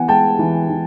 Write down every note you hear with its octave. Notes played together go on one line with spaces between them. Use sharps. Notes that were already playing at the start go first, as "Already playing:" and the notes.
Already playing: E3 B3 F#5 G#5
G#3 G5 A5
E3
E3